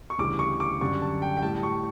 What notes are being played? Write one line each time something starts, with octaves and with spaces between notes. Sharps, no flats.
C#6
D2 C#3 E3 G3 D6
C#6
D6
F#2 D3 G3 C#6
A5
G5
G5
A2 G3 A5
C#6